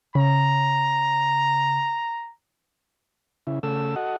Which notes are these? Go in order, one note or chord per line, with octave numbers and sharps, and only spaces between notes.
C#3 A#5
C#3 E4
C#3 A3 A4 E6
F#4 A4 D#5 F#5